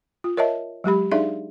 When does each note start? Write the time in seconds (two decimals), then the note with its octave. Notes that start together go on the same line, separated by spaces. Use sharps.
0.24 F4
0.37 A#4 C#5 D#5 E5 A5
0.84 F#3 G#3 G4 B5
1.11 D4 D#4 G#4 D5 E5 F5